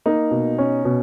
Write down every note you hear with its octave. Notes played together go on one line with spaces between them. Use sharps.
A#3 D#4
B2
C#4
B2